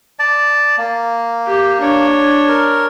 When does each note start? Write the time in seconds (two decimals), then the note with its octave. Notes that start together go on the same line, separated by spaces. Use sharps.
0.19 D5 A5
0.78 A#3
1.47 G4
1.80 D4 C#5
2.49 A#4